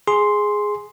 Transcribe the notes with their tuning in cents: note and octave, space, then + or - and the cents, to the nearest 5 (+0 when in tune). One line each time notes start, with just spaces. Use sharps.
G#4 +0 C6 +0